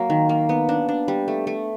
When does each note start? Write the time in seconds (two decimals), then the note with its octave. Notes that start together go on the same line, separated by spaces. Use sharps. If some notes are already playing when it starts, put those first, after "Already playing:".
Already playing: F#3 A#3
0.10 D#3
0.29 A#3
0.49 B3
0.69 D4
0.89 D4
1.08 G3
1.28 A3
1.47 A3